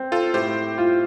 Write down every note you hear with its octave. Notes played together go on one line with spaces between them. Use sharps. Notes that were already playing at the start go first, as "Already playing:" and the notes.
Already playing: C4
F4 A4
A2 G4 C5
F4